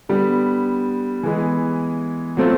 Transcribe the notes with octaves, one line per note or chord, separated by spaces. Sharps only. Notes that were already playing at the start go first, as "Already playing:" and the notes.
D3 G3 B3
E3 G#3 B3
F#3 A3 C4 F4